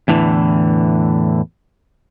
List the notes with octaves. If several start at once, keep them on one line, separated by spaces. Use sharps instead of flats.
E2 A2 D3 E3